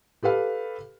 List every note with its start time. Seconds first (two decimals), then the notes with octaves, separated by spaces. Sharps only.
0.23 G4 A4 B4 F5